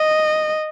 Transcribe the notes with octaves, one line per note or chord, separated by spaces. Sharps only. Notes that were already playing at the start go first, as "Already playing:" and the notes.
Already playing: D#5